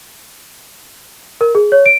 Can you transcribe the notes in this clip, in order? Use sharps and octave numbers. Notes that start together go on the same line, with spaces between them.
A#4
G#4
C#5
D7